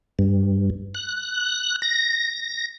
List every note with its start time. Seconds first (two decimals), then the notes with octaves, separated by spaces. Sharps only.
0.19 G2
0.95 F#6
1.82 A#6